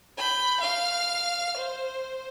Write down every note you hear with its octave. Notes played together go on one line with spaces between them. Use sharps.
B5 G6
F5 F6
C5